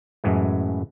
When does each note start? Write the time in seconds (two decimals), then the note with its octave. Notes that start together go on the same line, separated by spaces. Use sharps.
0.24 F#2 A2 E3 G#3